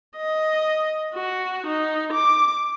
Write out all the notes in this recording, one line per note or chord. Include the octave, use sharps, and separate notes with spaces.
D#5
F#4
D#4
D6